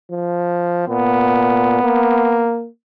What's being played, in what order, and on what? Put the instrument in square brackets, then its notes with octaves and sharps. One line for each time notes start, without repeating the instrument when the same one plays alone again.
[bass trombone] F3
[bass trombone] A#2 [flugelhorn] B3
[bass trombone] A#3